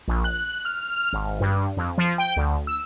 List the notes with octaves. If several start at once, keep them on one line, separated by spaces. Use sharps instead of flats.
A#1
F#6
F6
G#1
G2
F2
F3
G5
D2
E6